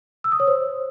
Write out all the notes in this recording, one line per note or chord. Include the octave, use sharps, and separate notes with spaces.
E6
D#6
C#5
C5